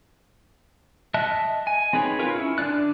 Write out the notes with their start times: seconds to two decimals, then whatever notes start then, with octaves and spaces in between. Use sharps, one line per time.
1.14 D#5 E5 A5 F#6
1.67 G#5
1.93 C4 D#4 G#4 B4 C#5
2.19 F4 A#4 B4 C#5
2.35 C#4 E4
2.58 D3 D4 D5 F#6